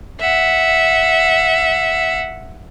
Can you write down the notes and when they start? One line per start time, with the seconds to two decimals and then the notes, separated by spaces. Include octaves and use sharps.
0.20 E5 F#5